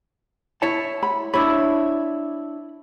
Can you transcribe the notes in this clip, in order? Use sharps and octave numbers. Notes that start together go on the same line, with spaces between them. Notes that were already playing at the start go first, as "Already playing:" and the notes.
E4 C#5 A5
B5
D4 E4 C#5 B5